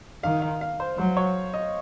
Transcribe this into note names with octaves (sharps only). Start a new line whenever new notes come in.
D#3 F5
F5
F5
C5
F#3 C5
C#5
D#5